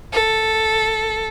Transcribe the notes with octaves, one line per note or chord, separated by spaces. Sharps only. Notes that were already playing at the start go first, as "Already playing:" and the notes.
A4